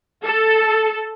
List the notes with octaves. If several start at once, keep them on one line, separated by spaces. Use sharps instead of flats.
A4